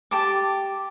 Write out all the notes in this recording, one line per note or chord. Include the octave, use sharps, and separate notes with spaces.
G4 A5 D6